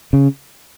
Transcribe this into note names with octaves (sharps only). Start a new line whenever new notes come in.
C#3